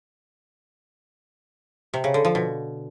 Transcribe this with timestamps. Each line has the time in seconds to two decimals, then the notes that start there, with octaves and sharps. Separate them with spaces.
1.94 C3
2.04 C#3
2.14 D3
2.25 F3
2.35 B2